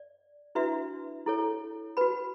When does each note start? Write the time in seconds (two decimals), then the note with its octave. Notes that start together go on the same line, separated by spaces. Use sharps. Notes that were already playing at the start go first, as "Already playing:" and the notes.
Already playing: D5
0.55 D4 E4 F#4 B4 E5
1.26 E4 A4 C#5
1.97 F#4 B4 B5